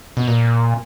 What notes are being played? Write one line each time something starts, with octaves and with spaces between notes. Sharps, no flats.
B2
A#2